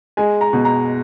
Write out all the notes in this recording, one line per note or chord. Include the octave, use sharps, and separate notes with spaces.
G#3 G#5
A#5
B2
A#5